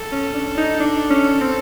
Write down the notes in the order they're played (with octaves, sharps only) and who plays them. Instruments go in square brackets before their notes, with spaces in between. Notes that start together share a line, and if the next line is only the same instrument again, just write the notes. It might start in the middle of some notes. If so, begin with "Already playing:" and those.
Already playing: [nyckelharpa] A4
[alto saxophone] C#4
D4
D#4
D4
C#4
C4